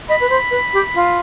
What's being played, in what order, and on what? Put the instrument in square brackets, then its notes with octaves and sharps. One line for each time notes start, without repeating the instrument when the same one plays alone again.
[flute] D#5 [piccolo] B5
[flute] B4
C5
B4
G4
F4